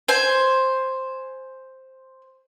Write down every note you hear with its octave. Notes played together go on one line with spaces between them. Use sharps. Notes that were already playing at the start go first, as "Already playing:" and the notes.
C5 G#5